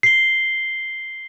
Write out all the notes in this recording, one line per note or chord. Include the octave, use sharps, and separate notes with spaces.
C7 G7